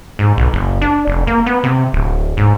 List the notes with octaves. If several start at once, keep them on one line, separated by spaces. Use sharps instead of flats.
G#2
B1
F#1
D4
F1
A#3
B3
C3
D1
G#2